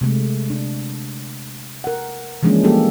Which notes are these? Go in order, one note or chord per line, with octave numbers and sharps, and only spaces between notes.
C3 G#3 A3
D4
A#4 F#5
E3 F3 G#3 A#3 C#4 D4
G3 A#3 G4 A4